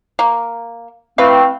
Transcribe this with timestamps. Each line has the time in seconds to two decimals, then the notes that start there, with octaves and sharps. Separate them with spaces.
0.19 A#3
1.18 E3 A3 C4 B4 F5